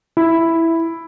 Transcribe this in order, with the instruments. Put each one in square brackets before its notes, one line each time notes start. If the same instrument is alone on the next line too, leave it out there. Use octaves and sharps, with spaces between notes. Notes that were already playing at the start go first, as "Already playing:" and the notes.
[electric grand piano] E4